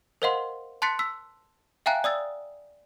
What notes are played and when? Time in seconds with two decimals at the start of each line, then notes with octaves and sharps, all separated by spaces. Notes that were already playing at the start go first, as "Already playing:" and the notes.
0.22 A#4 C5 D#5 F5 F#5 C6
0.82 A5 C6 F#6 A6 B6 C#7
0.99 E6 B6
1.86 E5 F5 G5 G#5 A#5 F#6
2.04 D5 D#6 E6 A6